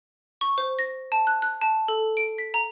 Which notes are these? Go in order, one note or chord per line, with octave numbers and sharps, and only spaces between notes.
C#6
C5
A#6
A5
F#6
F#6
A5
A4
D7
B6
A#5